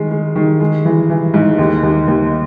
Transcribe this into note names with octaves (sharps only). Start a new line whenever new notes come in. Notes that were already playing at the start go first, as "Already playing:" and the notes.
Already playing: D#3 G#3
G#3
D#3
G#3
E3
E3
G#2
D#2
D#2
D#2